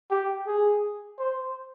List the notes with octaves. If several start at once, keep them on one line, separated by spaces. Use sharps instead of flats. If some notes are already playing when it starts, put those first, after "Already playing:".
G4
G#4
C5